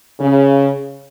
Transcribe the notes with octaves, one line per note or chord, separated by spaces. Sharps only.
C#3